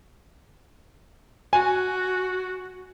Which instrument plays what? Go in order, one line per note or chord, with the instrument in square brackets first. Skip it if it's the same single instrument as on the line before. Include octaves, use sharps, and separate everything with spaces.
[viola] F#4 [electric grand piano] G#5